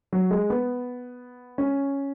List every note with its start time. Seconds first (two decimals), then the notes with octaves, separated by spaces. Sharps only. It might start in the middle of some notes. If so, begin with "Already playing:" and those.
0.13 F#3
0.31 G#3
0.50 B3
1.58 C#4